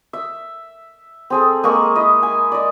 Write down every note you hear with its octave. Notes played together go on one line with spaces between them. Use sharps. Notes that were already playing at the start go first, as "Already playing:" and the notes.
E5
C4 G#4 A4
G#3 A#3 A#4 C#6
E4 D#5
G#5
D5 D#5